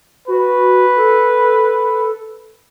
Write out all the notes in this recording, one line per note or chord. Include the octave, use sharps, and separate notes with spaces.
F#4 B4
A4